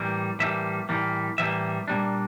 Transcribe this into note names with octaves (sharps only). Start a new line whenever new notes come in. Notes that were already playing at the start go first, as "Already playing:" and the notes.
Already playing: A2 E3 G3 A#3
A2 E3 G3 A#3 E5
A2 E3 G3 A#3
A2 E3 G3 A#3 E5
A#2 G3 A#3 D4